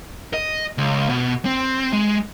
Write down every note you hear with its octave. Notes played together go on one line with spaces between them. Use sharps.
D#5
C#2
B2
C4
G#3